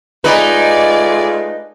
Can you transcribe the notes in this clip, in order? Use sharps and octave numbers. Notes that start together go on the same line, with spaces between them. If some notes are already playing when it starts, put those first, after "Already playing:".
G#3 A3 D#4 F4 B4 D5 G#5